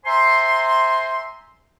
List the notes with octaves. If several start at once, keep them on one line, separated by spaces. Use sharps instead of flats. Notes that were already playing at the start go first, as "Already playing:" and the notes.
C5 E5 G#5 A#5 C6